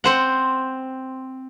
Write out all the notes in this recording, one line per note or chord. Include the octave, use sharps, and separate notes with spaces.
C4 C5 F#5